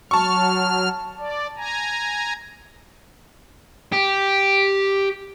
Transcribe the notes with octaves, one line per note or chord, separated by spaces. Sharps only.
F#3 A5 C#6 F6
D5
G#5 A#5
G4